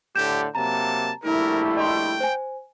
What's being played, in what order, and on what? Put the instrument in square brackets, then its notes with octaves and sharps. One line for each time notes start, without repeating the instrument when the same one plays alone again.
[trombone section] A2 D3 [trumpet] G4 [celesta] G6 E7
[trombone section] C3 F#3 A#3 [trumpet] A5 [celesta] A#5
[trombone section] A#1 G3 A3 [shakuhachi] E4 [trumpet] A#4
[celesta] D#5 C6 [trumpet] G5
[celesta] C5 G#5